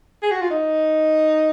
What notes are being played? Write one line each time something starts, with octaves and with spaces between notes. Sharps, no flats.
G#4
F#4
F4
D#4